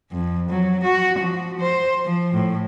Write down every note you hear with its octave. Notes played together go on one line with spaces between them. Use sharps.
F2
F#3
F#4
F3
C5
F3
A2